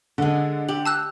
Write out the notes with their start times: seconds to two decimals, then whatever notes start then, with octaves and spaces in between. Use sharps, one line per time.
0.18 D3 G#3 A4
0.69 G4 F#7
0.86 A5 E6 F#6